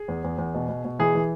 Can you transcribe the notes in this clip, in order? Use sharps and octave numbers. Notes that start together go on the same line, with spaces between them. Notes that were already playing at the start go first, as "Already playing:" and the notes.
Already playing: G#4
E2
E2
E2
B2
B2
B2
E3 G#4
E3